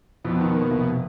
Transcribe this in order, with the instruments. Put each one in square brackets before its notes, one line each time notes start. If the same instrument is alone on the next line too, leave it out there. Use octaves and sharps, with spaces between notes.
[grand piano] F2 [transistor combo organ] B2
[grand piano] D#3
A#3
F1